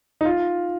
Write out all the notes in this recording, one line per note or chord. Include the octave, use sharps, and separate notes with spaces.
D#4
F4